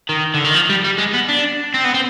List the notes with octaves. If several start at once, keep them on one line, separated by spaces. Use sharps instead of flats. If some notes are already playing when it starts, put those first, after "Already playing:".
D#3
D3
D#3
F3
G3
G3
G#3
B3
D4
C4
B3
C4